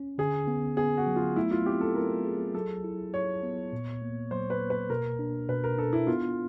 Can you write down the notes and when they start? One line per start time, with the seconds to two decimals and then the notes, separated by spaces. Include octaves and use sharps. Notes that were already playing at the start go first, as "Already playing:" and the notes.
Already playing: C#4
0.18 D3 G#4
0.47 B3
0.77 B3 G#4
0.97 F#4
1.07 F#3
1.16 F4
1.36 A3 E4
1.51 F4
1.66 C4 G4
1.81 A4
1.95 E4 A#4
2.25 G#4
2.54 F#3 A4
2.84 E4
3.13 F#3 C#5
3.43 B3
3.72 A#2
4.02 A#3
4.31 F#3 C5
4.50 B4
4.61 A#3
4.70 B4
4.90 B2 A#4
5.19 D4
5.49 B2 B4
5.64 A#4
5.78 D4 A4
5.93 E4
6.07 B3 F4